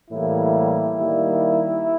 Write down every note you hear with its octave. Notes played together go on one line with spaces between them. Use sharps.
A2 E3 G3 A#3 E4
D#3 G3 A#3